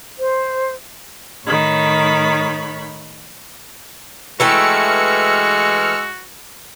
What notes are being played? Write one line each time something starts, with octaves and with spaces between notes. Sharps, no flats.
C5
A2 D#3 C#5 B5
E3 G#3 A3 F#4 G5 E6 F6 C#7